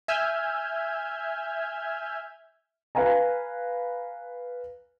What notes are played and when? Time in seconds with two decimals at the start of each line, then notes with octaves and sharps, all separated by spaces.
0.08 E5 G#5 E6 F6 G6 G#6
2.95 B4 F5 G#5 A#5